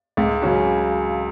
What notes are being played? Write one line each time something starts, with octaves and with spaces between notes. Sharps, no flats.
C#2
C#3 F#3 C#4 F#4